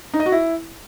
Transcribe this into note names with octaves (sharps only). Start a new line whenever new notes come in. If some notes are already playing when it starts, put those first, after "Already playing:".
D#4
D#5
F#4
E4